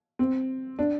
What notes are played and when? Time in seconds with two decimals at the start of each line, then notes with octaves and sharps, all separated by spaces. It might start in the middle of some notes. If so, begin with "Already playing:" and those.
0.19 C4
0.79 D4